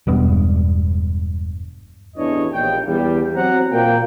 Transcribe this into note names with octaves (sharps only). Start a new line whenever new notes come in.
E1 G2 B3
A1 E2 E3 D4 C#5 D#5
A#1 D#2 G5
E2 G3
F#3 C4 F#4 C5 F#5 A#5
A#2 A#3 G5